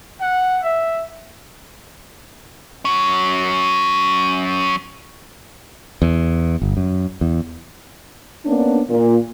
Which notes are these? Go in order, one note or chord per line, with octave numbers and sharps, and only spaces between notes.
F#5
E5
F#3 C#4
E2
G1
F#2
E2
A#3 B3 C#4 D4
A#2